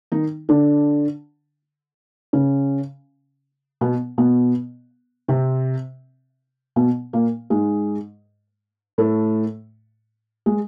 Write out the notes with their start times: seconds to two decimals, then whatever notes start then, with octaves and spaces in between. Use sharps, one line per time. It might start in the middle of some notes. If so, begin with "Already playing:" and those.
0.12 D#3 D#4
0.49 D3 D4
2.33 C#3 C#4
3.81 B2 B3
4.18 B2 B3
5.28 C3 C4
6.76 B2 B3
7.13 A#2 A#3
7.50 G#2 G#3
8.98 A2 A3
10.46 G#3